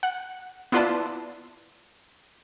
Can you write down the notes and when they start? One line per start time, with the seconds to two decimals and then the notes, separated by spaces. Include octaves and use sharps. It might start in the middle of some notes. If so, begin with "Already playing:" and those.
0.03 F#5
0.72 B3 E4 F4 B4 D5 A5